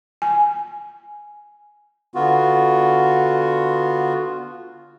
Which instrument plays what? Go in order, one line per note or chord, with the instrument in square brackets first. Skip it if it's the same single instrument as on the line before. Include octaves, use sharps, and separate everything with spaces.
[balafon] G#5
[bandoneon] D3 B3 F4 F#4